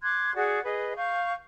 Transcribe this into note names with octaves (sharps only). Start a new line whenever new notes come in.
C6 D6 F#6 G#6
F#4 G#4 D5 F#5
G#4 B4 D#5
F5 C#6 G6